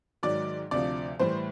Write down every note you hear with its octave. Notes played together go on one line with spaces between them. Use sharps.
G#2 D#3 F#3 D5
D2 C3 F3 D5
A2 E3 G3 C5